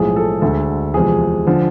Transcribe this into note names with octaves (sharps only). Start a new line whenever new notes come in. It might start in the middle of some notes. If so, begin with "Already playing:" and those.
Already playing: B1 A2 F3 G#3 G#4
A4
D2 D3 G#3 A4
E2 C3 F3 G#3 G#4
D3 F3